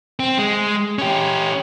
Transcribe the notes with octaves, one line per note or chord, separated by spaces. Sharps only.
C4
G#3
C#4 G4